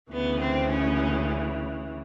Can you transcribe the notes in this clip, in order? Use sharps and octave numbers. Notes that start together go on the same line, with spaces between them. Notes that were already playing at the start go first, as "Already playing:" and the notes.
D2 C#3 E3 B3
C4
C#4